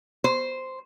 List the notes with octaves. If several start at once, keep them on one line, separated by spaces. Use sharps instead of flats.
C5